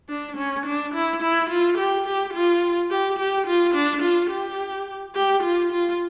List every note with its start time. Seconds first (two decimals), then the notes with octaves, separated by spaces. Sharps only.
0.09 D4
0.37 C#4
0.66 D4
0.94 E4
1.22 E4
1.49 F4
1.77 G4
2.06 G4
2.34 F4
2.91 G4
3.19 G4
3.47 F4
3.74 D4
4.02 F4
4.31 G4
5.15 G4
5.43 F4
5.72 F4